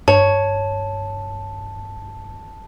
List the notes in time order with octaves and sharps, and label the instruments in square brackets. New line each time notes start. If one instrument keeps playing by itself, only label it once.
[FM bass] G2 [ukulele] C#5 [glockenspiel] A5